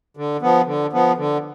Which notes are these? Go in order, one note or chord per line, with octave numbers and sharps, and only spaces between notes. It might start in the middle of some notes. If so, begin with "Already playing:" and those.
D3
F3 B3
D3
F3 B3
D3